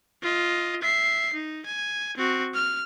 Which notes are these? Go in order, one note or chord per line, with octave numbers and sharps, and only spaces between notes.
F4 D#5
E5 C7
D#4
G#5
C4 F#4
F6